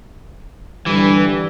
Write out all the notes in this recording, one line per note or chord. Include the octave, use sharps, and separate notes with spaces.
G2 D3 E3 G3